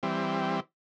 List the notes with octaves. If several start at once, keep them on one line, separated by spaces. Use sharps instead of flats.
E3 G3 C4